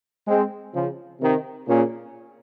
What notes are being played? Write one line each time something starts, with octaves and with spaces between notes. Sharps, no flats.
G#3 C4
C#3 F3
C3 D#3
A#2 C#3